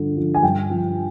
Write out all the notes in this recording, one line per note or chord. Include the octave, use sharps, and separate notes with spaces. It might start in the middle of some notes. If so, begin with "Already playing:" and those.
Already playing: G2 D3 F3
F3
G#5
G2 G5
F3